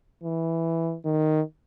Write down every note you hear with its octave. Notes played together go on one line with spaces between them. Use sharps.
E3
D#3